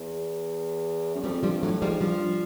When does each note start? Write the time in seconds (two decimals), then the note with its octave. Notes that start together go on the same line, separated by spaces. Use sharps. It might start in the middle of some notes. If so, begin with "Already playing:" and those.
Already playing: E2
1.15 F#2
1.23 F2 G3 A3
1.43 G2 F3 G3
1.62 A2 E3 F#3
1.81 G#2 F3 G3
2.01 G2 F3 G3